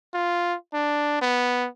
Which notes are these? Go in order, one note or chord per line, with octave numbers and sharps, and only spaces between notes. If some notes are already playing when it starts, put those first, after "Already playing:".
F4
D4
B3